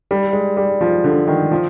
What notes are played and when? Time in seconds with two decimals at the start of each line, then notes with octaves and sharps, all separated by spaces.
0.11 G3
0.33 G#3
0.57 G3
0.81 F3
1.04 D3
1.28 D#3
1.51 F3